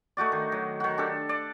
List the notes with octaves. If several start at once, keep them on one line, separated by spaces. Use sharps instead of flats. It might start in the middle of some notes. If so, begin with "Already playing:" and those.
A3 D#4 F#4 D5
D#3
F#3
D#3 F#4
D4 G4 A4
D5